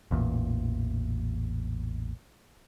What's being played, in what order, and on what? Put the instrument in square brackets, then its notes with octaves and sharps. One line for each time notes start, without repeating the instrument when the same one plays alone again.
[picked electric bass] A1 E2 A#2